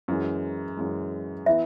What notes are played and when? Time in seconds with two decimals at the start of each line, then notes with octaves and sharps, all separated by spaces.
0.08 F#2 E3 G#3
0.77 F#2 E3 G#3
1.46 E3 B3 E4 E5